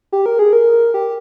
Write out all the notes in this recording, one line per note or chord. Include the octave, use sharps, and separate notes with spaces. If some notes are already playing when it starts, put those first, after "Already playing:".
G4
A#4
G#4
A#4
G4